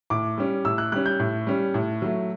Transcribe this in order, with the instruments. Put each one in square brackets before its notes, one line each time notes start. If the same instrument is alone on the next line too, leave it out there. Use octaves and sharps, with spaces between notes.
[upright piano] A2 D6
G3 C#4
A2 E6
F#6
G3 C#4 F#6
G6
A2
G3 C#4
A2
F#3 A3